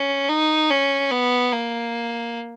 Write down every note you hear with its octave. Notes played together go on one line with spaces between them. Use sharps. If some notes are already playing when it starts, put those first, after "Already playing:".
Already playing: C#4
D#4
C#4
B3
A#3